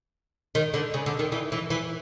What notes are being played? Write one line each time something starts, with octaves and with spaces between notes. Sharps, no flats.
D#3
D3
C#3
D3
D#3
E3
E3
E3